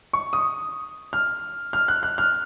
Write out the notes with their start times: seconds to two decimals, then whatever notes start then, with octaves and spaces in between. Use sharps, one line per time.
0.13 C#6
0.33 D#6
1.13 F6
1.73 F6
1.88 F#6
2.03 F#6
2.18 F6